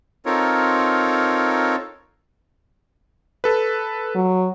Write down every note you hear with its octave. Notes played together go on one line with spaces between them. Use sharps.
C4 D#4 F4 A4 A#4 C#5
A4 B4
F#3